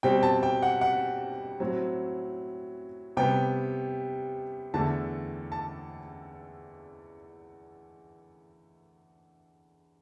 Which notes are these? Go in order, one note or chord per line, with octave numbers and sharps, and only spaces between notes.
B2 G3 C4 G5
A5
G5
F#5
F#5
A2 F#3 C4
C3 G3 B3 G5
E2 D3 A3 A5
A5